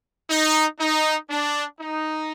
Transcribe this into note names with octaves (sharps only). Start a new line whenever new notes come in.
D#4
D#4
D4
D#4